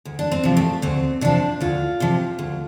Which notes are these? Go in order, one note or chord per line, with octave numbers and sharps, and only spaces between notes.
D2
D4
C4
C3 F3
A3
D2 C4
C3 F3 D4
D2 F4
C3 F3
D2